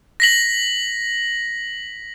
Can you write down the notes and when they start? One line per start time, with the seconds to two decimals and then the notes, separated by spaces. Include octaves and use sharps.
0.20 A#6 B6 F#7